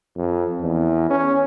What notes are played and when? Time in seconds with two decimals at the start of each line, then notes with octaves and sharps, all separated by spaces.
0.16 F2
0.61 E2
1.10 C#4